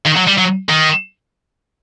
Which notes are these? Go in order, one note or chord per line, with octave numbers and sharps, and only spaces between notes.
D#3
F#3
G3
F#3
D#3